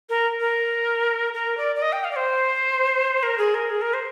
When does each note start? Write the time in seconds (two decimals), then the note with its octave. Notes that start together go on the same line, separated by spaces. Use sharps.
0.10 A#4
0.40 A#4
1.34 A#4
1.58 D5
1.76 D5
1.82 D#5
1.93 G5
2.04 F5
2.11 D5
2.16 C5
3.23 A#4
3.38 G#4
3.54 A#4
3.70 G#4
3.82 A#4
3.94 C5